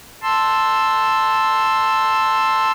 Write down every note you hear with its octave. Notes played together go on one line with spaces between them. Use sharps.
A5 C6 E6